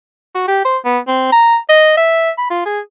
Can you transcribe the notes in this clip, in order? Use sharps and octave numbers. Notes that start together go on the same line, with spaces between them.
F#4
G4
C5
B3
C4
A#5
D#5
E5
B5
F4
G#4